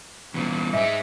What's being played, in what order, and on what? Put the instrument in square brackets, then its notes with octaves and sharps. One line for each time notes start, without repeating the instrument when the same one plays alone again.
[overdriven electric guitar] E2 A#2
[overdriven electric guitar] G#2 G#3 [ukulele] D#5 E5 G#5